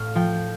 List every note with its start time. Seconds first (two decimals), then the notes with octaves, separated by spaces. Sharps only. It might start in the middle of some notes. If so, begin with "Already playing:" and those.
Already playing: A2 F5
0.15 F3 G5